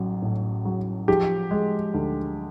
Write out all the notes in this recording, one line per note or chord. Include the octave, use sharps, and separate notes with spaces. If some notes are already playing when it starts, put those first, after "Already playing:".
Already playing: A1 F#3
A2
F#3
F3 G4
G#3
D2